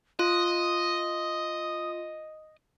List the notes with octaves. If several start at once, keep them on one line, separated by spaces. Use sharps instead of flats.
F4 D#5 D#6